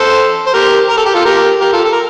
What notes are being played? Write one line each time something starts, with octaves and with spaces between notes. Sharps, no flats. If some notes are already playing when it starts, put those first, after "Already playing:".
Already playing: A4 C5
C5
G4 A#4
A#4
A4
G4
F4 A4
G4 A#4
G4 A#4
F4 A4
A4
A#4